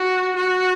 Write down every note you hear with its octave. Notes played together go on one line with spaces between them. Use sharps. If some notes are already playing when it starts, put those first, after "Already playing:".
Already playing: F#4
F#4